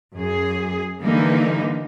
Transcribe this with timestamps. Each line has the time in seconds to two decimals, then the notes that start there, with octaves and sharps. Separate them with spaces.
0.15 F#2 G#4
1.01 D3 E3 G3 A#3 D#4